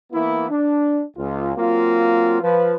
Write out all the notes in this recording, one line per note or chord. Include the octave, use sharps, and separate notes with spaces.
E3 A#3 B3 E4
D4
C#2 F4
F#3 A#3 C4 F4
F3 B4